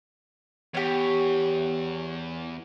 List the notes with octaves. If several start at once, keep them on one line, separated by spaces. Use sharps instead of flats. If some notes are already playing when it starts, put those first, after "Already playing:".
E2 G4 C#5